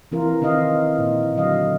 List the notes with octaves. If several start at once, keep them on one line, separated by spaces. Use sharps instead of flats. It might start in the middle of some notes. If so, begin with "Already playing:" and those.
E3 C4 F4 A#4
D#3 C4 D#4 D#5 F5
A#2 E4
D3 F#3 D#5 F5